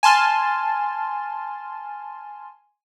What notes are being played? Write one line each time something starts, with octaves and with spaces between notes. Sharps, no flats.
G#5 A5 C6 F6 A6